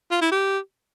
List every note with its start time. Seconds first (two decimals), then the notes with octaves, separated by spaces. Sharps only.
0.11 F4
0.21 E4
0.32 G4